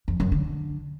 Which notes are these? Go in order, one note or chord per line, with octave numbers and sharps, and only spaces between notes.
F2
F#2
D3